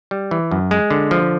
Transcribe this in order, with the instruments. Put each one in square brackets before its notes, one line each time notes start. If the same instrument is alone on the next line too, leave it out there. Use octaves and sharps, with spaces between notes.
[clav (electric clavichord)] G3
E3
F#2
G#3
D3
F3